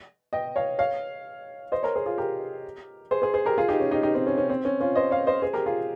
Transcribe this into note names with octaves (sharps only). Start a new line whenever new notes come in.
D#5 G5
C#5 F5
C#5 F5
C5 D#5
A#4 C#5
G#4 C5
F4 G#4
G4 A#4
G#4 C5
G#4 C5
G#4 C5
G4 A#4
F4 G#4
D#4 G4
C#4
D#4 G4
D#4 G4
C4 D#4
C#4
C#4
C4
C#4
C#4 F4
C5 D#5
C#5 F5
C5 D#5
G#4 C5
G4 A#4
F4 G#4